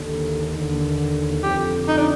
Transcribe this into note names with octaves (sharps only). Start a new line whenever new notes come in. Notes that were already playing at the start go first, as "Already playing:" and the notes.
Already playing: D#2 D3
D#2 D3
F2 D3 G4
D#4
D4